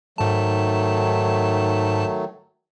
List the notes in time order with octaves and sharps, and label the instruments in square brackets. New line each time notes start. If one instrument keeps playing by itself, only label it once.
[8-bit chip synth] G#2 A5 [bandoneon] D#3 F#3 A3